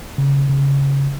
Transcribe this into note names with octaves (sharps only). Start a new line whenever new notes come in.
C#3
C#3